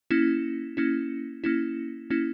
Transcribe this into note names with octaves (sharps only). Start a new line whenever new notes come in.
A#3 C#4 E4
A#3 C#4 E4
A#3 C#4 E4
A#3 C#4 E4